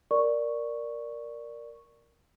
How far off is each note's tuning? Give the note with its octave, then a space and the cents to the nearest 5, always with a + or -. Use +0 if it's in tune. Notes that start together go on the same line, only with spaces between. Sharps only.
A#4 +0 D5 +0 C#6 +0